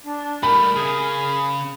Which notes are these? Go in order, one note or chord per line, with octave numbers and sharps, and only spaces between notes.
D4
G3 A3 A#4 B5
C#3 G#4